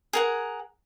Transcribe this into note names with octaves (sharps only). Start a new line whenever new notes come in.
G#4 A#4 F#5